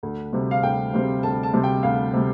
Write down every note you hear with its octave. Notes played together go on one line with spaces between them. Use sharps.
D2
C3 G3 C4
F5
D2 G5
C3 G3 C4
D2 A5
A5
C3 G3 C4
G5
D2 F5
C3 G3